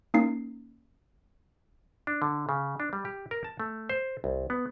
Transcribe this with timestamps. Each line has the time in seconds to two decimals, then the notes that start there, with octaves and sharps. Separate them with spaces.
0.14 A#3 C#4 D#4 C7
2.07 D4
2.22 D3
2.49 C#3
2.80 D4
2.93 G3
3.05 G4
3.31 A#4
3.44 A5
3.60 A3
3.90 C5
4.24 C2
4.50 B3